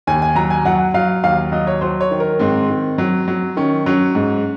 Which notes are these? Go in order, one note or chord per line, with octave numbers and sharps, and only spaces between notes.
D#2 G#5
G#5
F#3 A#5
G#5
F#3 F#5
F#3 F5
D#2 F5
F#3 D#5
C#5
F#3 C5
C#5
D#3
A#4
G#2 C4
D#3
F#3
F#3
D#3 C#4
F#3 C#4
G#2